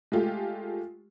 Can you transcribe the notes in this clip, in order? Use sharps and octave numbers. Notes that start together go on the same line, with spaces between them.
G#3 A3 F4 G4